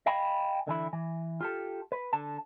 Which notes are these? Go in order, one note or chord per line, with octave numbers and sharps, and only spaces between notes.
D#5 F5 G5 G#5 B5
D3 E3 E4
E3
F4 G4 A4
B4
D3 A5